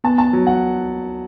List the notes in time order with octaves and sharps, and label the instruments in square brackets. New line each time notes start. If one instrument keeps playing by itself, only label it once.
[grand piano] B3 A5
A5
F#3
F#5